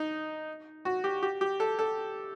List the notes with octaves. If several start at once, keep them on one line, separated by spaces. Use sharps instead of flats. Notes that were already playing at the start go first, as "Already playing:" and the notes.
Already playing: D#4
F#4
G4
G4
G4
A4
A4